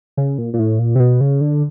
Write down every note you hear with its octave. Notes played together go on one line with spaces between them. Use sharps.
C#3
A#2
A#2
A2
A#2
C3
B2
C#3
D3